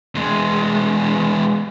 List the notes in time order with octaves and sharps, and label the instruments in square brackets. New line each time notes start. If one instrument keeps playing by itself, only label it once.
[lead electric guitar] E2 G#3